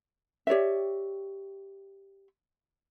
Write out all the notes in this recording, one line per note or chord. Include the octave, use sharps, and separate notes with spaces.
G4 C#5 D5 E5